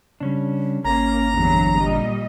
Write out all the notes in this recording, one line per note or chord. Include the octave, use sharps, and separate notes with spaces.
C#3 G3 C#4 D4
G#1 A#3 C#4 A#5
E2 G2 D3 F#3 C4
A#2 G3 D#5